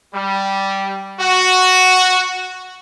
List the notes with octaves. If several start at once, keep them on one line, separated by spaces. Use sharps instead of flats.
G3
F#4